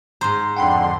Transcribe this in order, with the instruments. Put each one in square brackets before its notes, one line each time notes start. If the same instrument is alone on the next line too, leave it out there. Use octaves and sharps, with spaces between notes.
[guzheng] G#2 C5 [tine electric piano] A#5 C6
[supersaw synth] F2 D3 C6 [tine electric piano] F#5 G5 B5